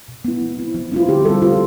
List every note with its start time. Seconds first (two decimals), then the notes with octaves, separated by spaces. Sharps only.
0.08 B2
0.25 B3 E4
0.41 F3
0.58 C4 E4
0.75 F3
0.92 C4 E4 F4
1.08 D3 G4
1.25 G3 A4
1.30 C4
1.42 D3 F4